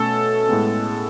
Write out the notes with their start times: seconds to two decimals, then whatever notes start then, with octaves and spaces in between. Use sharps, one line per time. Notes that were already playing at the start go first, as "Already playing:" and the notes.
Already playing: B2 A3 C#4 A4
0.49 A2 G#3 B3